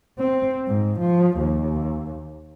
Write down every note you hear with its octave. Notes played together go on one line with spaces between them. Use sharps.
C4
G#2
F3
D#2